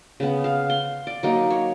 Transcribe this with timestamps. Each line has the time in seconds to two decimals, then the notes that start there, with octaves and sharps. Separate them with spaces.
0.20 C#3 B3
0.44 F5
0.70 C6
1.07 D5
1.23 F#3 A#3 D#4
1.51 C#5